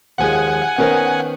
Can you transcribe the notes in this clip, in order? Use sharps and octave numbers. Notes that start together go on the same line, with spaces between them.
D#2 F3 G#3 F#5 G#5
D#3 B3 C#4 A#4 C5